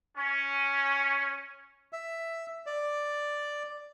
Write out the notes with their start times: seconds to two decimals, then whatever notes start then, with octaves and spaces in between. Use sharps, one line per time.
0.17 C#4
1.93 E5
2.66 D5